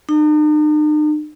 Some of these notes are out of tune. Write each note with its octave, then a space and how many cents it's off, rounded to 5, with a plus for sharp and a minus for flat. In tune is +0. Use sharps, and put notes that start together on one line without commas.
D#4 -45